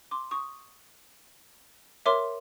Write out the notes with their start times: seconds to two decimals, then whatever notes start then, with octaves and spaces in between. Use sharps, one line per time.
0.11 C6 D6
0.31 C#6 D#6
2.06 A#4 C#5 E5 C6 D6